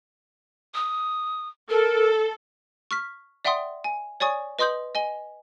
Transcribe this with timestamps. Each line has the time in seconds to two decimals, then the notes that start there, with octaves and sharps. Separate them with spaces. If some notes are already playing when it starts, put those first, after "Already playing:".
0.74 D#6
1.70 A4 A#4
2.91 C#6 F6 B6
3.45 D5 E5 F#5 G5 C6 D#6
3.84 G#5
4.20 C#5 D5 G#5 C#6 D#6
4.59 B4 D#5 C6 D#6 G6 F#7
4.95 D#5 G#5 G7